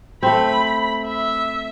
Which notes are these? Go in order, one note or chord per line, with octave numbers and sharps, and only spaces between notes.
A3 C4 B5
E5